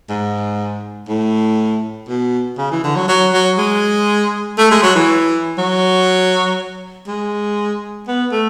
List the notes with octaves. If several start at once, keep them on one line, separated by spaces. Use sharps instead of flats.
G#2
A2
B2
C#3
E3
D3
F#3
F#3
F#3
G#3
A3
G#3
F#3
E3
F#3
G#3
B3
A3